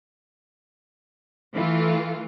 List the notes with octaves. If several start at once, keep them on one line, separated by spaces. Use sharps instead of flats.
E3 A3 F4